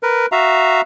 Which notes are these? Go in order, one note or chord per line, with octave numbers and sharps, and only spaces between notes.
A#4 B4
F#4 E5 F5 A#5